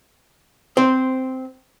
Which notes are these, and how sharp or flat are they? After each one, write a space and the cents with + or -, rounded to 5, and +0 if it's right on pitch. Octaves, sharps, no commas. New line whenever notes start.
C4 -10 C5 +0